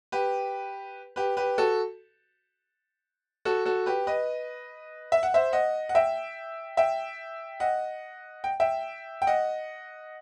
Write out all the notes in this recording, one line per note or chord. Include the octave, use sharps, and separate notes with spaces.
G4 B4
G4 B4
G4 B4
F#4 A4
F#4 A4
F#4 A4
G4 B4
B4 D#5
E5
F#5
C5 E5
D#5 F#5
F#5
E5 G5
E5 G5
D#5 F#5
G5
E5 G5
G5
D#5 F#5